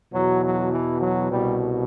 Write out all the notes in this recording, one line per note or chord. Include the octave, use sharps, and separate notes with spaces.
E2 B2 F#3
F#3
E3
F#3
C2 B2 G3